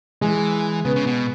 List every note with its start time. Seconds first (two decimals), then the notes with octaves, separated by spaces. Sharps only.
0.21 E3 G#3
0.85 C#3 B3
0.96 C#3
1.07 B2